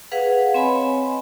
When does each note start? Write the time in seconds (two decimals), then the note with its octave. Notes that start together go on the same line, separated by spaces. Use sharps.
0.11 G#4 B4 F5 F#5
0.54 C4 C#5 D#5 G#5 B5